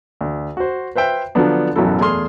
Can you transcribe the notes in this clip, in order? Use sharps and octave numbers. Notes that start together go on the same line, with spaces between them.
D2
F#4 C5
B4 C5 E5 G5
D3 F3 F#3 B3 D4
A1 F#2 B2 F#3 E4 A4
E2 A3 G#4 G#5 C6 F6